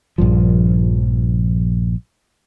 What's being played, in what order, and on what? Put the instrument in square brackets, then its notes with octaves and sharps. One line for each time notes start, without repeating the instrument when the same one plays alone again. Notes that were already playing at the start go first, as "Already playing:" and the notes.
[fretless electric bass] A#1 G2 F3